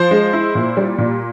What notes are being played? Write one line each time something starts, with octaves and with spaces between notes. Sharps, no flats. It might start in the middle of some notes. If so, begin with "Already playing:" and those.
Already playing: F3 C5
G#3
E4
A#2
G3
A#2